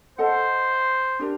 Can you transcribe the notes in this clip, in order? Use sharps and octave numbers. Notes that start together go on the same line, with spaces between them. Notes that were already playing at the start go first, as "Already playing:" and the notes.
A4 C5 D#5 F#5 A5
D4 G4 A#4